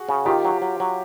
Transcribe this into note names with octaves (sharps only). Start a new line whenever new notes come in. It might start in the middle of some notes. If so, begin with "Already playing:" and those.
Already playing: F#4 G#4
C#3
D#3 F4 G4
F#3
F#3
F#3